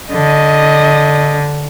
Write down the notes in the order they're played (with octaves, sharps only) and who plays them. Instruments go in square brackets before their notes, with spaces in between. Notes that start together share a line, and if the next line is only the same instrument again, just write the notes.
[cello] D3 [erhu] D#5